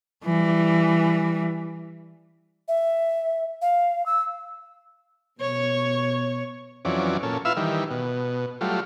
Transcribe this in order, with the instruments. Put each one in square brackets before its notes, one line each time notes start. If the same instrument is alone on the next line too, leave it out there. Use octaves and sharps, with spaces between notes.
[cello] E3 G3
[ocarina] E5
F5
E6
[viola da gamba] B2 C#5
[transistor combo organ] F2 E3 F#3 C#4 D5
A#2 C#4 A4
E4 F4 B4 E5 F5 E6
D#3 E3 G3
B2
F#3 G3 A3 F4